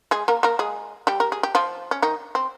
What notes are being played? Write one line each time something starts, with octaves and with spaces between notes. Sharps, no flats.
G#3 G#4
A#3 A#4
A#3 A#4
G#3 G#4
G3 G4
A#4
G#4
G4
F3 F4
C#4
D#3 D#4
C4